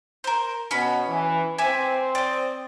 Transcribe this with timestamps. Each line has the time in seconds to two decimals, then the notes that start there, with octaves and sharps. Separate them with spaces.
0.24 A#4 C5
0.71 B2 C#4 B5
1.08 E3
1.58 C4 E5 G#5 D6
2.15 D5 D#5